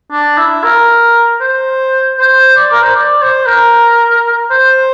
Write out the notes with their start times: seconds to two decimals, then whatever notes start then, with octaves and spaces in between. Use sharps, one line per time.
0.12 D4
0.38 E4
0.64 A#4
1.41 C5
2.19 C5
2.57 D5
2.72 A#4
2.83 C5
2.96 D5
3.22 C5
3.47 A#4
4.51 C5